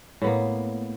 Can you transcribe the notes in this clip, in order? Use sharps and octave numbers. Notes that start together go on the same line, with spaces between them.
A2 A#3 B3